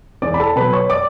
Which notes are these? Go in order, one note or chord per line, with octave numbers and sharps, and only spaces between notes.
E2 D5 D6
B5
A4 A5
B2 F#3 B4 B5
C#5 C#6
D5 D6